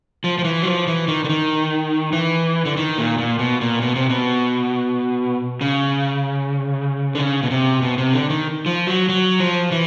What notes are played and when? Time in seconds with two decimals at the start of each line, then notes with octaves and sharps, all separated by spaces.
0.24 F3
0.38 F3
0.44 E3
0.62 F#3
0.66 F3
0.87 E3
1.08 D#3
1.24 D3
1.29 D#3
2.13 E3
2.65 D3
2.77 D#3
2.98 A#2
3.18 A#2
3.39 B2
3.61 A#2
3.82 B2
3.96 C3
4.10 B2
5.61 C#3
7.15 D3
7.19 C#3
7.43 B2
7.51 C3
7.82 B2
7.98 C3
8.13 D3
8.30 D#3
8.66 F3
8.87 F#3
9.09 F#3
9.40 F3
9.72 E3